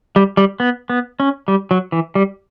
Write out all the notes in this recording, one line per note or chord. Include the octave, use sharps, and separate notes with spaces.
G3
G3
B3
B3
C#4
G3
F#3
E3
G3